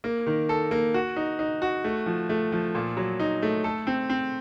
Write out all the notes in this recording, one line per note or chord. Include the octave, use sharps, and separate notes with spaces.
A#3
D#3
A4
A#3
F#4
D#4
D#4
F#4
A3
F3
A3
F3
A#2
F#3
D#4
A3
A4
C4
C4